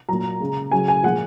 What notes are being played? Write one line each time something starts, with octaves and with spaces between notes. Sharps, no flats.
A#2 F#3 A#5
C#3 G#3
C#3 F#3 G#5
G#5
A#2 F3 G#3 F#5